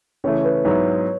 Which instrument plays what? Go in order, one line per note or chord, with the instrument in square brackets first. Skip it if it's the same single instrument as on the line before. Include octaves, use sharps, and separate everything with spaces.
[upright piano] C#3 E3 A3 [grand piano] C#5
[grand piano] B4
[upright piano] G#2 F#3 B3 E4 [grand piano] C#5